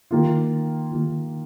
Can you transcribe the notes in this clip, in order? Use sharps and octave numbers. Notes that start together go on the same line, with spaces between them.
D#3 A#3 F4
D#3 A#3 F4